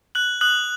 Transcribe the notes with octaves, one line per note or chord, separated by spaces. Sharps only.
F#6 F#7
D#6 F#6 F#7